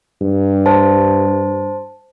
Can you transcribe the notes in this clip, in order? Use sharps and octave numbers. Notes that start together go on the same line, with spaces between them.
G2
C5 A5